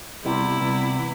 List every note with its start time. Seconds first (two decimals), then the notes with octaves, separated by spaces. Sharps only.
0.24 C3 G3 B3 E4
0.61 C3 G3 B3
0.99 E3